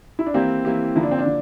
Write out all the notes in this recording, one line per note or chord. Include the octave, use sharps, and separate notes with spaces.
E4
D4
E3 A#3 C4 E4 G4
E3 A#3 E4 G4
D3 F3 A#3 E4
D4
C4
D4
D3